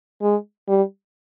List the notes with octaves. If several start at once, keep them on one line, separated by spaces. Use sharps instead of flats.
G#3
G3